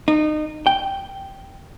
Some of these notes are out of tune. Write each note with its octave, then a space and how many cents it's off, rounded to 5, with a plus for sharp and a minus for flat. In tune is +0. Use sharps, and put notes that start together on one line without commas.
D#4 -30
G5 -5